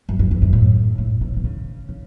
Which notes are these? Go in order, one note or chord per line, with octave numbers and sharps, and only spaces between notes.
F#2
F#2
E2
F#2
A2
A2
B2
B2
C#3
C#3